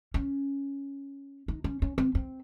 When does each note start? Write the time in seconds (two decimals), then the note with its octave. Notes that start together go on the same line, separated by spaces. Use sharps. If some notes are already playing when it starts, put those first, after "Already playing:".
0.14 C#4
1.48 D#4
1.64 C#4
1.82 C#4
1.98 C4
2.15 C4